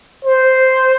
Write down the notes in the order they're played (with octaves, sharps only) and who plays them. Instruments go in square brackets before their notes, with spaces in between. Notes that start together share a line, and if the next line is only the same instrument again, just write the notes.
[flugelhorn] C5